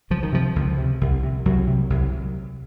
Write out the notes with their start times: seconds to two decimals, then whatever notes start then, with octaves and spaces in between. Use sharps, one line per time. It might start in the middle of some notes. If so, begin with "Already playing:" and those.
0.10 C#2 F3
0.23 D#3
0.32 C3 F3
0.56 C#2
0.78 C3
1.01 C2
1.23 C3
1.45 C2 F#3
1.67 C3
1.90 C2